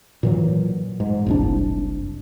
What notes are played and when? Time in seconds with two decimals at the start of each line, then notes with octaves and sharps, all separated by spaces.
0.23 A#2 E3 F#3
1.00 G#2
1.26 F#1 C2 D4